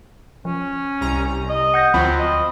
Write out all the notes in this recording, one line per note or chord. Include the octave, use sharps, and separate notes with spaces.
F3 C#4
C2 A#5
D#5
F#5 G6 A#6
D2 F3 F#3 C4 B5
D#5